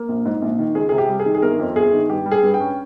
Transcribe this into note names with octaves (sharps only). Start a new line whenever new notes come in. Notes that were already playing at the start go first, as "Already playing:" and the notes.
Already playing: A#3
A#1
G#2
A#1
D#3
C#2 G#4
C3 G#4
G4
G3
G#4
D#3
G#4
G1 A#4
F2
G1 G#4
D#3
G2 G4
G3
G#4
G2
G5
C#4